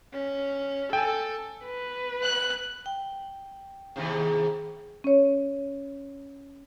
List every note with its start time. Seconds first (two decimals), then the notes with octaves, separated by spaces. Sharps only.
0.13 C#4
0.93 A4 G5 G#5
1.65 B4
2.22 F#6
2.86 G5
3.96 D#2 G#2 C3
5.04 C#4 C#5